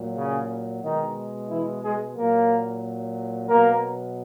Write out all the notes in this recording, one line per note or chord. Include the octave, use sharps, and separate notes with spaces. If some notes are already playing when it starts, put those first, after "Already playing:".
Already playing: A#2 F#3
C#3 C#4
B2 D#3 G#3 D#4
E3 E4
G#3 G#4
A#2 F#3 A#3 A#4
B2 F#3 A#3 A#4